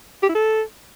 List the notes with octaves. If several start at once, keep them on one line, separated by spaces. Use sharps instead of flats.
G4
E4
A4